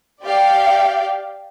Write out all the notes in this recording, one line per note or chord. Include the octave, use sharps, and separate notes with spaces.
G4 D5 F5 G5